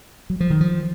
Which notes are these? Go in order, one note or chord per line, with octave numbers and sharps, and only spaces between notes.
F#3
F3
D#3
F3